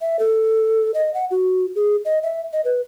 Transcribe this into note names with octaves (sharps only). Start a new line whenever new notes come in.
E5
A4
D#5
F#5
F#4
G#4
D#5
E5
D#5
B4